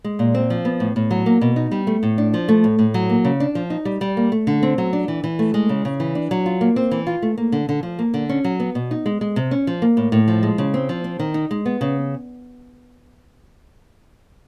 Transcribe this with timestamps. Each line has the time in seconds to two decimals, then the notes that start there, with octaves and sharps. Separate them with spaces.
0.04 G#3
0.19 A#2
0.34 C4
0.50 F3
0.65 B3
0.80 A2
0.96 A2
1.11 F#3
1.26 A#3
1.41 B2
1.56 D#4
1.71 G3
1.87 A3
2.03 A2
2.18 D4
2.34 F3
2.48 A3
2.64 A2
2.79 A2
2.94 F#3
3.09 A#3
3.25 C#3
3.40 D4
3.55 F3
3.70 D#4
3.85 G3
4.01 G3
4.17 A#3
4.32 A3
4.47 D3
4.63 C4
4.78 F#3
4.93 D4
5.08 E3
5.24 E3
5.39 A3
5.54 G#3
5.69 C#3
5.85 C#3
6.00 E3
6.15 D4
6.31 F#3
6.46 F4
6.61 A#3
6.76 C4
6.91 E3
7.07 F4
7.22 A3
7.38 A#3
7.52 D3
7.69 D3
7.83 F3
7.99 A#3
8.14 D3
8.29 C#4
8.44 F#3
8.60 B3
8.75 B2
8.91 D#4
9.06 G#3
9.21 G#3
9.36 C3
9.51 C#4
9.67 F3
9.82 A#3
9.97 A2
10.12 A2
10.28 F3
10.43 G#3
10.58 C#3
10.74 C4
10.89 F3
11.04 C4
11.19 D#3
11.34 D#4
11.51 G#3
11.66 B3
11.81 C#3